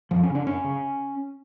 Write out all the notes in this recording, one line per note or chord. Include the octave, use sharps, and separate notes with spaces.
F#2 F3
C#4
C#3
D4
F#2 C#4
C#3